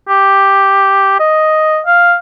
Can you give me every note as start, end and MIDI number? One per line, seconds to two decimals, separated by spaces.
0.08 1.19 67
1.19 1.80 75
1.86 2.15 77